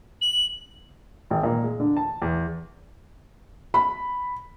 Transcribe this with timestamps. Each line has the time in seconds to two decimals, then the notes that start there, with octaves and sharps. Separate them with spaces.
0.21 F#7
1.30 G#1
1.43 A#2
1.64 G#3
1.80 D3
1.97 A5
2.22 E2
3.74 B5